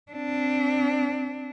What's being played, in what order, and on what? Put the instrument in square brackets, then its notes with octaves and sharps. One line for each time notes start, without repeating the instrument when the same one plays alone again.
[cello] C4 D4